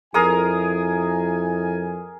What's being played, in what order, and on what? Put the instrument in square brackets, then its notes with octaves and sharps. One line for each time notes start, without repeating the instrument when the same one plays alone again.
[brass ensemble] F2 E4 G#5 [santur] G#4 A#4 D#6